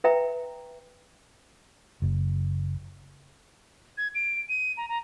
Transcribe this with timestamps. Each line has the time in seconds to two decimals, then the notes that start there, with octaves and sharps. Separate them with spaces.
0.04 B4 E5 G5 A#5
2.02 F#1
3.98 G#6
4.15 D7
4.49 D#7
4.77 A#5
4.89 A#5